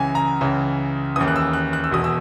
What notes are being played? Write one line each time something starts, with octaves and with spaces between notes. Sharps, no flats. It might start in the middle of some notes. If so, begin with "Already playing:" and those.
Already playing: C#2 C#3 E3 G#5
A#5
C#2 C#3 E3
D#2 C#3 E3 D#6
F#6
E6
F#6
F#6
E6
E1 E2 B2 D#6
E6